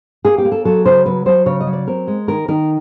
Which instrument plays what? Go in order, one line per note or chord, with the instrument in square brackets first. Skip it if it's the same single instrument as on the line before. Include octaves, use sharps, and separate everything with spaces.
[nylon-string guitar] A#3 G#4
G4
A#3
A4
F#3 A4
C#3 C5
F#3 B4
F#3 C5
C#3 C#5
D#5
F#3
D5
C4 A#4
G#3
D#3 A#4
D#3 A#4